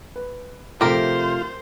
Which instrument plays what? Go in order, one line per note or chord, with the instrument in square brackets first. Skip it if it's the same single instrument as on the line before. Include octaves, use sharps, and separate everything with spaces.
[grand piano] B4
[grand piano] C3 F3 A3 [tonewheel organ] F4 [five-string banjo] G4 A#4 [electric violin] C5